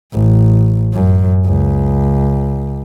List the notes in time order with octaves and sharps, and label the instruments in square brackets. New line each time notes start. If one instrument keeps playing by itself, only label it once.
[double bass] A1
F#2
C#2